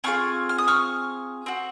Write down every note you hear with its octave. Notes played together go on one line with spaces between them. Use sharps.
C4 F4 G#4 C#6 F6
F6
D#6
C#6 F6
C4 F#4